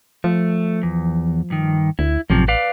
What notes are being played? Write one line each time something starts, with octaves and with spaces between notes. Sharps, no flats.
F3 A3
E2
G2 D#3
D2 E4
A1 F#2 C3 F3
B4 D5 F5